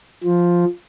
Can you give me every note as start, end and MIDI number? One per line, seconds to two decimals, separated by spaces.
0.23 0.65 53